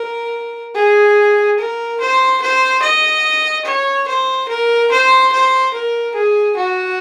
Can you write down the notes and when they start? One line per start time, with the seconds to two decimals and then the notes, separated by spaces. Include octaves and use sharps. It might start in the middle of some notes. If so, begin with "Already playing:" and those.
Already playing: A#4
0.75 G#4
1.59 A#4
2.00 C5
2.42 C5
2.83 D#5
3.65 C#5
4.08 C5
4.49 A#4
4.91 C5
5.32 C5
5.74 A#4
6.15 G#4
6.57 F#4